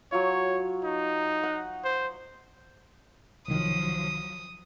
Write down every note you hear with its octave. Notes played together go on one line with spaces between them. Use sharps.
F#3 F4 C#5
D#4
F#5
C5
C2 D#3 F3 F#3 D#6